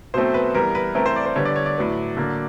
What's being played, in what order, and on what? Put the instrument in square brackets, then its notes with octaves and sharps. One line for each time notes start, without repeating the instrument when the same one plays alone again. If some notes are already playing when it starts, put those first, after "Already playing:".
[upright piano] B2 F#3 A3 C4 C5
B4
E3 G3 B3 A#4
B4
E3 A3 C4 A#4
C5
D5
C5
D3 G3 B3 C#5
D5
C#5
D5
A2 F#3 B3
D3 F#3 A#3